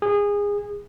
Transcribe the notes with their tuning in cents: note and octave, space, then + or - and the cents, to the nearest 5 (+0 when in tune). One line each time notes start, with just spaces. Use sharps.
G#4 -25